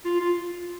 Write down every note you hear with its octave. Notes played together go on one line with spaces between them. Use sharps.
F4
F4